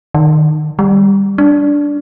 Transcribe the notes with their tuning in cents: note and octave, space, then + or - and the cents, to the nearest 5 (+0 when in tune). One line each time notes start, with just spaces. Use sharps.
D#3 -20
G3 +15
D4 -10